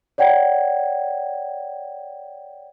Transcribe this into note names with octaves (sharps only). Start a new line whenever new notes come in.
C#5 D5 F#5 G5 G#6